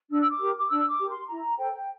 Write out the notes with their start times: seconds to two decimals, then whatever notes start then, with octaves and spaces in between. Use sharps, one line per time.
0.10 D4 E6
0.21 E6
0.29 D6
0.40 G4 A#4
0.58 D6
0.69 D4 E6
0.89 D6
1.00 G4 A#4
1.09 C6
1.29 E4 A#5
1.58 A4 C5 G5